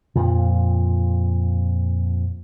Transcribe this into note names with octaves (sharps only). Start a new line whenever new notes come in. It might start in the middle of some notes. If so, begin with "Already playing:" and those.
F2 A#2 F3